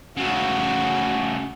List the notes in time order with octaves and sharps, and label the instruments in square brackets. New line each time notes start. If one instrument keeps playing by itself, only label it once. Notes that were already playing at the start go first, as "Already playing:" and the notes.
[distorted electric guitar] C#3 A3 [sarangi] F#4